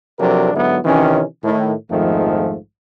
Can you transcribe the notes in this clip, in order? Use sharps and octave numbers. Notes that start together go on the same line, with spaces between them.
C3 F3 F#3 D4 A4 A#4
G#2 D3 F#3 B3 E4
C3 D#3 E3 C#4
A2 D#3
A#1 F2 G#2 D#3 F3 A3